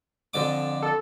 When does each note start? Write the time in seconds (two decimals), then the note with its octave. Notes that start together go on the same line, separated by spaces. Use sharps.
0.34 F2 D3 D6
0.83 A4